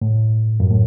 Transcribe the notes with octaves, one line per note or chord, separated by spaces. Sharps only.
A2
F#2
A2